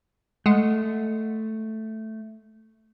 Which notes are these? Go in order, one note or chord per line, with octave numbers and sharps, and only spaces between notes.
G#3 A3 F#5